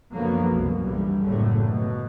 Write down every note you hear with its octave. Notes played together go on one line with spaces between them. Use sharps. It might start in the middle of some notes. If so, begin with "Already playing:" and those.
F#2 D3 F3 F#3 A#3 B3
C2 F#2 B2
G2 D3 E3 G3
F#1 A2 D3 F#3 A3
B2